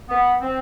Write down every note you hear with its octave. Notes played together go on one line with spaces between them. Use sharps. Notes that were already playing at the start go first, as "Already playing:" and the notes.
B3
C4